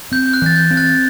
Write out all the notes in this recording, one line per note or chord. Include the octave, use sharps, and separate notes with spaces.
C4 G6
G6
F#6
E3 A6
G6
C4
F#6 A6